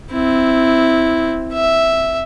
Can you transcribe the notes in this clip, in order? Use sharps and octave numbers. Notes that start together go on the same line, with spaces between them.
C4 E4
E5